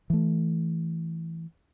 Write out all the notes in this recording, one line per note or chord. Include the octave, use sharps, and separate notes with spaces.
E3 A3